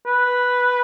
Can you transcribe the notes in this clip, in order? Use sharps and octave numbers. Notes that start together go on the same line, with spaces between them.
B4